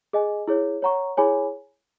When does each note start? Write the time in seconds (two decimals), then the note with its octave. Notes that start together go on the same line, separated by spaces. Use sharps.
0.13 G#4 D#5 G#5
0.47 E4 G#4 C#5
0.82 C#5 F#5 A#5 C#6
1.17 E4 G#4 C#5 G#5 B5